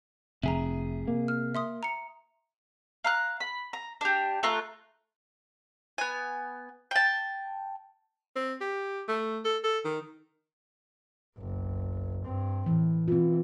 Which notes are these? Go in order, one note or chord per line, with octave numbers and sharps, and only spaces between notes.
F1 C3 G#4 E5 A#5
A#3
F6
E5 C6 D#6
A#5 C#7
F5 A#5 F6 F#6
B5
A#5
D4 G4
A3 F4 A#5 F#6
B3 G#5
G5 A5
C4
G4
A3
A4
A4
D#3
F#1 B1
G2 C4
A2 E3
B2 E3 C4 F4